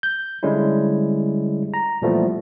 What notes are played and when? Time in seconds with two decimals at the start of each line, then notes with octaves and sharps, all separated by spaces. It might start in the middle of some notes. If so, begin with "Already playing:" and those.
0.03 G6
0.43 D3 G3 G#3 C#4 E4
1.74 A#5
2.02 A#2 E3 F3 G3 A3 B3